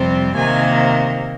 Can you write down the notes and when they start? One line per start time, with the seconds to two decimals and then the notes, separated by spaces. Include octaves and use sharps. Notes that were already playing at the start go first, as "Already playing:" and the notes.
Already playing: F2 C3 G3 C4
0.35 C3 D#3 A#3 G#5